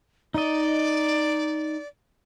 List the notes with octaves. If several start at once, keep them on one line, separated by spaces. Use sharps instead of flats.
D#4 D5 D#5